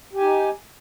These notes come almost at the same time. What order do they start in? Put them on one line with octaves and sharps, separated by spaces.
G4 G#5 D#4